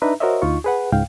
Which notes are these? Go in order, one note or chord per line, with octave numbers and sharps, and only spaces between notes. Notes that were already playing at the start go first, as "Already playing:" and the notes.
D4 D#4 B4 E5 A#5
F#4 A#4 C5 C#5 D#5 E5
D2 D#4 F4 C#6
G#4 B4 F#5
C#2 G#2 F5 G5